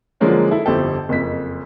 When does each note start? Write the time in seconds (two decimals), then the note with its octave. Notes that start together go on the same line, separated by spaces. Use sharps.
0.20 D3 F3 F#3 G#3 A#3 C#4
0.51 E4 A4
0.66 G1 F2 C4 G4 A4
1.09 F#1 F2 B6